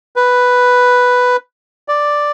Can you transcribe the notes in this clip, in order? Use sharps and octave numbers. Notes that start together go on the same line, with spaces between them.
B4
D5